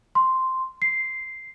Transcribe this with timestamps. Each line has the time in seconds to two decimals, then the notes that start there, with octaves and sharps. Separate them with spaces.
0.15 C6
0.82 C7